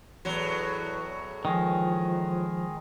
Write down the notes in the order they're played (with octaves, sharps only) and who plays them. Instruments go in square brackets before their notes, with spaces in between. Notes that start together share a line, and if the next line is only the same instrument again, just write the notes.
[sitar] E2 A2 F#3
[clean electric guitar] D#3 G#3 [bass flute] F3